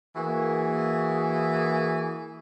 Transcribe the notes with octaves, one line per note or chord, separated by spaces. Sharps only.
E3 A#3 F#4 G#4